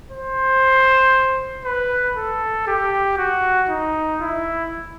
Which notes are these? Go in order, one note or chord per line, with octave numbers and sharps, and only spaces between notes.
C5
B4
A4
G4
F#4
D#4
E4